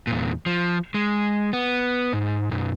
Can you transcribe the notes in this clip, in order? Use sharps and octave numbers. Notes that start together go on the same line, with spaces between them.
E2 A#2
F3
G#3
B3
G#2
B1 F#2